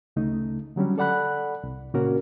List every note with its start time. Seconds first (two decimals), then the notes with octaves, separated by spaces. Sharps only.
0.16 D2 C#3 A3 D#4
0.76 D3 F#3 G3 C#4
0.98 A4 D5 F#5 B5 F#6
1.63 C2
1.94 A#2 C#3 A#3 C#4 F#4 A#4